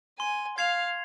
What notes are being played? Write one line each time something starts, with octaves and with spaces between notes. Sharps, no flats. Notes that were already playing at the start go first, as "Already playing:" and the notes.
G#5 C6
F5 G#6 C7 F7